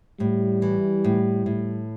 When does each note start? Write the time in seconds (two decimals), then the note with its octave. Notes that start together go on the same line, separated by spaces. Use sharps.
0.20 A2 G3
0.62 E3
1.04 A2
1.46 A2